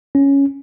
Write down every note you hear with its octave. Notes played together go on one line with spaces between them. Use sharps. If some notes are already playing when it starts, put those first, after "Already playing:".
C#4